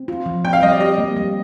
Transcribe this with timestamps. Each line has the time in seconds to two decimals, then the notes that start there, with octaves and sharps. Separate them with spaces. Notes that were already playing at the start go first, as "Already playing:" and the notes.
Already playing: C4
0.08 F4
0.26 F3
0.45 C4 G5
0.53 F5
0.62 G3 D#5
0.72 D5
0.80 G4 D#5
0.98 A#3
1.16 G3